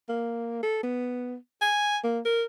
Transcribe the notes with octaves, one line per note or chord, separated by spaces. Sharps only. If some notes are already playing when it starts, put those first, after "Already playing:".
A#3
A4
B3
G#5
A#3
A#4